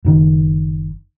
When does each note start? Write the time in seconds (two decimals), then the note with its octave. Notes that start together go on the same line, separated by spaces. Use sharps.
0.05 F#1 D#3